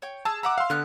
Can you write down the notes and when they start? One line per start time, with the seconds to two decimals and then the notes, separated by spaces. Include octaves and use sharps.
0.02 C#5 G5
0.25 G#4 A5 E6
0.43 E5 F#5 A#5 D6
0.58 F5 C6
0.70 D3 B3 F6 F#6